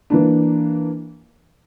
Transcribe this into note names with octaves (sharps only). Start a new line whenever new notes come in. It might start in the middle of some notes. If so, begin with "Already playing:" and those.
E3 A#3 D4